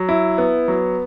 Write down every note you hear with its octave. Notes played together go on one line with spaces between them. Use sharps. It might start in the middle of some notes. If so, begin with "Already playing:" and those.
Already playing: F#3
E4
B3
F#3